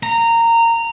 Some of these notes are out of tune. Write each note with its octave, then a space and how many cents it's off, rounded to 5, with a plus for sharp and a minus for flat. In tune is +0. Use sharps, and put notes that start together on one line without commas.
A#5 -15